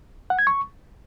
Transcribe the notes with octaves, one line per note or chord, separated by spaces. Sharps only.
F#5
G#6
C#6